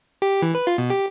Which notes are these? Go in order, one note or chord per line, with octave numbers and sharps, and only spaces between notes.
G4
E3
B4
F4
B2
G4